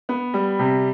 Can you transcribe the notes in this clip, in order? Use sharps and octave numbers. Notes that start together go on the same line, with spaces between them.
B3
G3
C3